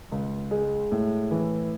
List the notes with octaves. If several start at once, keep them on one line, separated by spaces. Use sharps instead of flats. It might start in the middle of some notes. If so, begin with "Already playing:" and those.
C#2
G#3
A2
E3